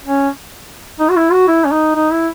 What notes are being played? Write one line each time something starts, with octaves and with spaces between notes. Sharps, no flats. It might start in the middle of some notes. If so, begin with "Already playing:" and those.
C#4
D#4
F#4
E4
F#4
E4
C#4
D#4
D#4
E4